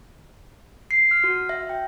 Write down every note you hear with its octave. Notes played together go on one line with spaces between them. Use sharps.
C7
F6
F#4
E5
G5